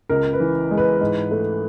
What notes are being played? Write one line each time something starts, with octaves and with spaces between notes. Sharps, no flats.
C#2 A#4
B4
E3
G#3
B4
G#2
A3